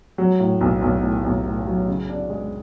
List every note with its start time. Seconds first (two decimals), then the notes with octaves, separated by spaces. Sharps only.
0.18 F#3
0.40 A2
0.61 B1
0.82 B1
1.03 A2
1.24 B1
1.45 A2
1.67 F#3
1.88 C#3
2.09 D4
2.30 G#3